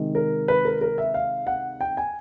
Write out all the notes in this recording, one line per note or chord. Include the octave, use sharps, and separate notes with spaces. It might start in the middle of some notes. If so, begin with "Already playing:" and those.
Already playing: C3 D#3 G#3
A#4
B4
A#4
A#4
E5
F5
F#5
G5
G#5